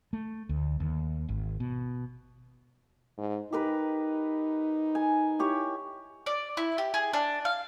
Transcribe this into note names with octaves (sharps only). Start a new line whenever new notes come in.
A3
D2
D#2
G#1
B2
G#2
D#4 G4 A#4 B4
G#5
E4 G4 C#5
D5
E4
G4
G#4
D4
F5